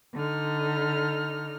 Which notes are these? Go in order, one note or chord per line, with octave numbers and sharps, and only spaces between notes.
D3 D#4 F6